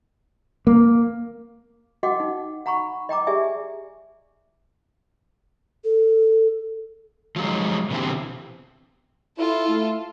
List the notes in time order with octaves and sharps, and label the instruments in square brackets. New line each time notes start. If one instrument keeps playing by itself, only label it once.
[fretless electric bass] A#3
[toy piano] F#4 D#5 F#5 G5 D6
D#4
F#5 A#5 B5 C#6
D#5 G5 A#5 D6
G4 G#4 D5 E5 G#5
[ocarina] A4
[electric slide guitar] F3 F#3 G#3 D#4
B2 D3 E3 G#3 C4 G4
[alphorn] E4 [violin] F4 A4
[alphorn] A3